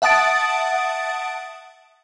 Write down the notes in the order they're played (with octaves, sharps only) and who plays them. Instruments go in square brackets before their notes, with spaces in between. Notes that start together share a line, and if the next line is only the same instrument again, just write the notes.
[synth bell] E5 F#5 A5 D#6 A6 D7